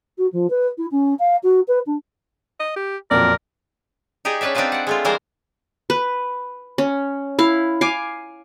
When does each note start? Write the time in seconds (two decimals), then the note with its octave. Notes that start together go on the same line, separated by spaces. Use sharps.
0.18 F#4
0.32 F3
0.50 B4
0.77 E4
0.91 C#4
1.19 F5
1.43 F#4
1.68 B4
1.86 D4
2.60 D#5
2.76 G4
3.11 F2 A#2 F#3 A#4 D5
4.25 D#4 G4 G#4 D5 D#5
4.41 C#4 D4 B4 D5 E5
4.55 C4 D4 D#4 F4 B4 C5
4.72 D5 F#5
4.87 G#3 A3 F4
5.05 E3 G3 G#3 A#4 C5 F5
5.90 B4
6.78 C#4
7.39 E4 F5
7.81 F5 G#5 D6